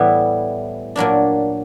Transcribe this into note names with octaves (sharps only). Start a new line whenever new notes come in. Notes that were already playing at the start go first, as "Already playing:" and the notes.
Already playing: A2 E3 G3 B3 E4
A#2 F#3 A#3 D4